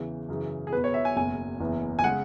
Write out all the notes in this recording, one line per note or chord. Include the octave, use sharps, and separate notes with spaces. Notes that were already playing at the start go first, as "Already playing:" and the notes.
Already playing: E2 C#3 E3
F#2 C#3 E3
G#4
E2 B2 B3 B4
C#5
E5
G#5
F#1 E2 B2 G#5
F#1 E2 E3 B3
G#5
C#3 G#3 F#5